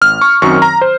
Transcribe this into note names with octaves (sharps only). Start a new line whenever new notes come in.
G#1 F6
C#6
F#2 D#3 F#3 C4 C#6
A#5
C5